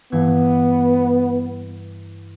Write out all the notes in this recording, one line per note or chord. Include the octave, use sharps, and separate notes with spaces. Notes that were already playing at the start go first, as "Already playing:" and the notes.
G2 E3 B3 G#6